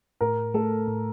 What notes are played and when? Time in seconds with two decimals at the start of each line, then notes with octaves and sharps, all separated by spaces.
0.21 A2 A#4
0.54 A3 A4
0.88 A2